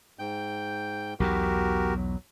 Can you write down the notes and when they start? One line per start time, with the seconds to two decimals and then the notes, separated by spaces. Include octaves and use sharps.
0.19 G#2 G5 G6
1.20 B1 E2 B2 F#4 G4 A#4
1.96 F#3